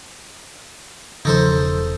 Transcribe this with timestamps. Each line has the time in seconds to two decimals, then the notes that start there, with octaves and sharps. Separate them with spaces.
1.25 E1 C#3 F3 C#4 D#4 A4 C5